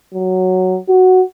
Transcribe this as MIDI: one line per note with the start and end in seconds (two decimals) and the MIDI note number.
0.14 0.78 54
0.89 1.21 66